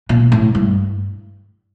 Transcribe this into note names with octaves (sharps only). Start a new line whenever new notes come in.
A#2
A2
G2